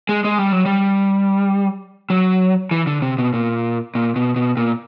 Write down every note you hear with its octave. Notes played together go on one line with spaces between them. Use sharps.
G#3
G#3
G3
F#3
G3
F#3
E3
D3
C3
B2
A#2
A#2
B2
B2
A#2